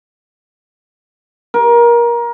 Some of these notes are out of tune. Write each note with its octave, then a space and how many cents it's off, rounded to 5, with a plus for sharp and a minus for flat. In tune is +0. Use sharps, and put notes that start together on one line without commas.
A#4 +25